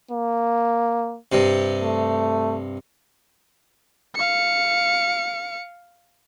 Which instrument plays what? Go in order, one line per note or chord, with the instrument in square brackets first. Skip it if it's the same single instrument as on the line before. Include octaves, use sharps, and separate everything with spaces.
[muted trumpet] A#3
[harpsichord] G2 C3
[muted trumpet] A3
[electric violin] F5 C#7